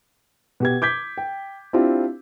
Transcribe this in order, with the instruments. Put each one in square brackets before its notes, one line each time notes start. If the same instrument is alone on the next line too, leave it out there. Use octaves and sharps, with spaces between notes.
[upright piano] B2 G4 G#6
D6 G6 G#6 B6
G5
C4 D4 E4 F4 G4